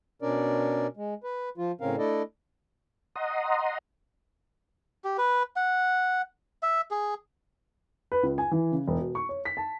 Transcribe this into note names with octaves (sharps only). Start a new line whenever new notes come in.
B2 C#4 D4 A#4 D5
G#3
B4
F3 F4
A2 C#3 C4 C#4 A#4 F5
A3 D4 E4 A4 D5 D#5
D#5 F#5 A#5 C6 D#6
G4
B4
F#5
E5
G#4
B4
C#2
G#5
E3
C#3
E1
B2
C#6
C#5
B6
A5